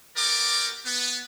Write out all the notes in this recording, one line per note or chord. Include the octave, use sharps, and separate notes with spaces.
B3 F#4 G4 A#4 D5 D6
B3